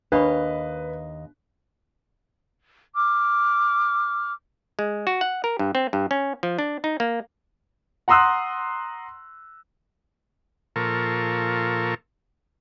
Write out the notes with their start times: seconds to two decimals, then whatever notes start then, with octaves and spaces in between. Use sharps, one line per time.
0.12 D#2 D4 B4 D#5 F5 B5 C#6
2.95 D6 F6
4.79 G#3
5.07 F#4
5.21 F#5
5.44 A#4
5.59 G2
5.75 C4
5.93 G2
6.11 C#4
6.43 F3
6.59 D4
6.84 D#4
7.00 A#3
8.08 F#5 A#5 C6 D#6 E6 F#6
10.76 A#2 F3 A4 A#4 C#6